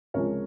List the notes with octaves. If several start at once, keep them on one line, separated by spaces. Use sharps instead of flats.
C#2 C3 F3 G#3 A#4 C#5